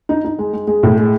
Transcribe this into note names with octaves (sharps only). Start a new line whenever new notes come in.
D#4
D#4
G#3
G#3
G#3
A2
G#3